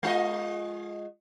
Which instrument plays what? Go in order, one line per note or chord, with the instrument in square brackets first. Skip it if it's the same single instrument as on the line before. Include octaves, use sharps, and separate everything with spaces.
[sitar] G#3 F4 D#5